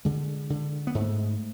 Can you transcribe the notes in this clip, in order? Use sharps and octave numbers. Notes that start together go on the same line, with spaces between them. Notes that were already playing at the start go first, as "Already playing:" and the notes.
D3 G#3
D3
B3
G#2 A3